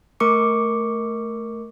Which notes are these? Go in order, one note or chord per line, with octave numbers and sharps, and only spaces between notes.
A3 A#4 C#6 D6 C#7